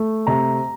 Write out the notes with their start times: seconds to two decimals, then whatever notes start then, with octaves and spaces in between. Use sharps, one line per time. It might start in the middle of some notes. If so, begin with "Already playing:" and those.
Already playing: A3
0.27 C3 A#5